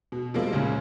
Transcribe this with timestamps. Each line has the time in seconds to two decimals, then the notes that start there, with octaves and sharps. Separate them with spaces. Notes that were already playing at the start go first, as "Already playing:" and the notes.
0.12 B2
0.34 C3 F3 G3 G#3 A#3
0.53 C#2 A#2 C#3